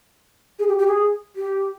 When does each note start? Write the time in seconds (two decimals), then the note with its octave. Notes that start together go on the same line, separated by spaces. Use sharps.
0.59 G#4
0.68 G4
0.78 G4
0.87 G#4
1.36 G4